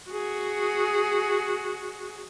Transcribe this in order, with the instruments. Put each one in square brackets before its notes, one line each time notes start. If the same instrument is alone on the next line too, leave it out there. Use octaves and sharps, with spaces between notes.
[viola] F#4 G#4